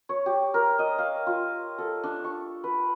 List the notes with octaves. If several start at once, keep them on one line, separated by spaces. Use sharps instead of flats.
C#5
G4
A#4
D#5
F5
F4
A4
D4
C#6
B4